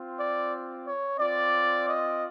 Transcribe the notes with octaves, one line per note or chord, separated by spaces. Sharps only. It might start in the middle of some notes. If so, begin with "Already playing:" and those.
Already playing: C4 F4
D5
C#5
C4 F4 D5
D#5